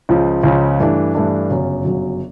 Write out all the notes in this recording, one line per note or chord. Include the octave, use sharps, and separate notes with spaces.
C#2 C#3 F3
C#2 C#3 F3
G2 E3 A3 D4
G2 E3 A3 D4
G1 F#2 C#3 F#3
G1 F#2 C#3 F#3